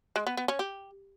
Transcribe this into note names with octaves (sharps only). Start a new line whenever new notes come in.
G#3
B3
B3
C#4
G4